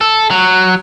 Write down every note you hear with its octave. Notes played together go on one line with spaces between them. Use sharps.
A4
F#3